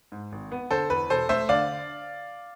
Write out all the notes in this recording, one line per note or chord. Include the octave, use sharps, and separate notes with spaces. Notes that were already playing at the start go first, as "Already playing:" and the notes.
G#2
G#1
B3
D3 A4 C5
E2 B4
E1 A4 C5
A3 C5 E5
D3 D5 F5